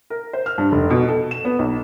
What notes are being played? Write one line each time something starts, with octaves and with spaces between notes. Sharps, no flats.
A#4
C5
F6
G2
F1
B2
A4
E7
B3
B1